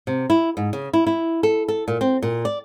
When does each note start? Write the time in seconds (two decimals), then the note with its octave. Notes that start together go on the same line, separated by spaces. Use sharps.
0.07 C3
0.30 E4
0.57 G#2
0.73 C#3
0.93 E4
1.07 E4
1.43 A4
1.68 A4
1.88 A#2
2.01 C4
2.23 A#2
2.45 D5